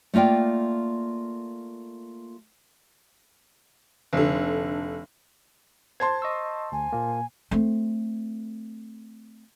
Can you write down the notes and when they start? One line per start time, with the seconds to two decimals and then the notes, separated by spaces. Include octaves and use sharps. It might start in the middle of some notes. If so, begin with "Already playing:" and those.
0.14 A3 A#3 F4 D5 G5
4.13 F1 D3
6.00 C5 A5 C6 G#6
6.22 D#5 C#6 E6
6.72 D2 G#5
6.93 A#2 A#3
7.51 A3 C4